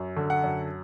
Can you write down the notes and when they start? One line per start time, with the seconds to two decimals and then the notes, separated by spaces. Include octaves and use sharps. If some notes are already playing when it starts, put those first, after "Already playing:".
Already playing: F#2
0.17 D3
0.30 F#5
0.44 F#2